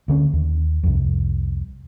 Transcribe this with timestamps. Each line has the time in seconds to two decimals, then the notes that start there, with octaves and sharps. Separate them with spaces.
0.08 D2 D3 C#4
0.33 D#2
0.83 C2 F2